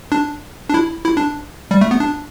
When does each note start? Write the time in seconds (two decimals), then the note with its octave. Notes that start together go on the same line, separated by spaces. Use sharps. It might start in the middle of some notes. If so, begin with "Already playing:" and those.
0.12 D4
0.70 D4
0.74 E4
1.05 E4
1.17 D4
1.71 G3
1.81 A3
1.91 B3
2.00 D4